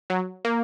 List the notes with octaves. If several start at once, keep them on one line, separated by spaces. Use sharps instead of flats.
F#3
A#3